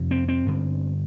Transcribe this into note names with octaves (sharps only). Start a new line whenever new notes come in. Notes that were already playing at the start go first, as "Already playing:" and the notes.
Already playing: F2 C3
C4
C4
G2 D3